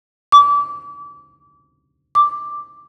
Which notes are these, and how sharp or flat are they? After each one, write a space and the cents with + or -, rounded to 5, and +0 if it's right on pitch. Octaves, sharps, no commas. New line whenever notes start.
D6 -30
D6 +5